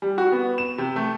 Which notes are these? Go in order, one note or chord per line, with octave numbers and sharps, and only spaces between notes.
G3
F#4
B3
E7
C3
A3